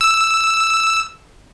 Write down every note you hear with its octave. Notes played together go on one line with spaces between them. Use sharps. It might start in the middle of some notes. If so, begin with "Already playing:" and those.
E6